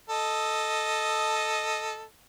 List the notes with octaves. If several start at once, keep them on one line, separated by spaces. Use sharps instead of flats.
A4 D#5